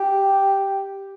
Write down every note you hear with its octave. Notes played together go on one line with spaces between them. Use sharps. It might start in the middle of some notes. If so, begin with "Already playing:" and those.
Already playing: G4